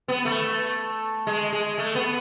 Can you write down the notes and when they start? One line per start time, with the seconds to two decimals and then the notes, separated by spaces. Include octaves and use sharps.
0.08 B3
0.25 A3
1.27 G#3
1.53 G#3
1.78 A3
1.95 B3